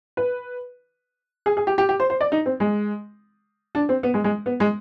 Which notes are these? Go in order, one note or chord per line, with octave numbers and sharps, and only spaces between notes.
B4
G#4
G#4
G4
G4
G4
C5
C5
D5
D#4
C4
G#3
D4
C4
B3
G#3
G#3
B3
G#3